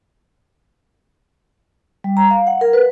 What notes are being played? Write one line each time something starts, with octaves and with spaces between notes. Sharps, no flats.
G3
A#5
F5
F#5
A#4
B4